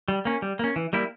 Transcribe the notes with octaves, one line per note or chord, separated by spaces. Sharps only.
G3
A#3 C#4
G3
A#3 C#4
E3
G3 A#3 E4